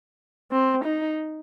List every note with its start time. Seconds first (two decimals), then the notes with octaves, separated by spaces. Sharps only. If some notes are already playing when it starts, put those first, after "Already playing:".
0.52 C4
0.84 D#4